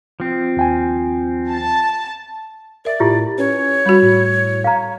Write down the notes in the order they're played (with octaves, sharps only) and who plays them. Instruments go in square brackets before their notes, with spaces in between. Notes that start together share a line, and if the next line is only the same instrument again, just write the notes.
[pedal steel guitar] F3 C4
[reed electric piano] D#2 G5 G#5
[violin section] A5
[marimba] A#4 E5 [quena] D5
[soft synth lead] A2 [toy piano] E4 F4 G4
[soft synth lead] C#4 [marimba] B4 [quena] C#5
[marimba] G3 F#4 [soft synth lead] B5
[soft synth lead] A2
[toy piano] F5 A#5